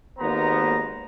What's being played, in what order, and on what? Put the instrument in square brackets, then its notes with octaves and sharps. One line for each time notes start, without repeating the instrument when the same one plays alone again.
[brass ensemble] G#1 D#2 A#3 B3 C5 A#5